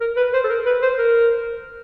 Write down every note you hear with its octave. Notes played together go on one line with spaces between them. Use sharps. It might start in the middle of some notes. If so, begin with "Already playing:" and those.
A#4
B4
C5
A4
A#4
B4
C5
A#4